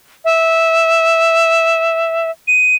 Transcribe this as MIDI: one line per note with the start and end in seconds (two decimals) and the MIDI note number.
0.25 2.30 76
2.48 2.76 99